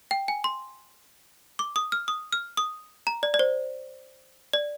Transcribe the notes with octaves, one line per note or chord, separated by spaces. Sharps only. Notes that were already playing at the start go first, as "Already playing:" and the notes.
G5
G#5
C6
D6
D#6
F6
D#6
F6
D#6
A#5
D5
D5
C5
D5